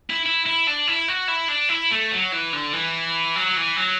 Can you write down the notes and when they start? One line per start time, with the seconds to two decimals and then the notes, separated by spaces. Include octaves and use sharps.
0.10 E4
0.26 E4
0.46 E4
0.67 D4
0.87 E4
1.08 F#4
1.28 E4
1.49 D4
1.69 E4
1.91 A3
2.12 F#3
2.33 E3
2.53 D3
2.73 E3
3.36 F#3
3.57 E3
3.76 F#3